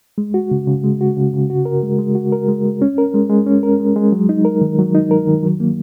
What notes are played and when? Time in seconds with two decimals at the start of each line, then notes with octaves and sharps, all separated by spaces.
0.18 G#3
0.34 F#4
0.51 C#3
0.67 C#3
0.84 G#3
1.01 F#4
1.17 C#3
1.33 C#3
1.50 F#4
1.65 A#4
1.83 G#3
1.98 G#3
2.15 F#4
2.32 A#4
2.48 G#3
2.64 G#3
2.82 C#4
2.98 A#4
3.14 G#3
3.30 G#3
3.47 C#4
3.63 A#4
3.80 G#3
3.96 G#3
4.12 F#3
4.29 D#4
4.45 A#4
4.61 D#3
4.79 F#3
4.95 D#4
5.11 A#4
5.27 D#3
5.43 F#3
5.60 A#3